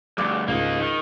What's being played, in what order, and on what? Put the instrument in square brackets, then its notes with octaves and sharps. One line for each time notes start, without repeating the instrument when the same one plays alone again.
[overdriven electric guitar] D2 G2 [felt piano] D6
[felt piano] C#2 G#2 [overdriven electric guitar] A#3 D#4
[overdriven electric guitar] D#3